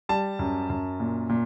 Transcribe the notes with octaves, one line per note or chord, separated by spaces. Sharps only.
G3 A5
F#2
F#2
A#2
A#2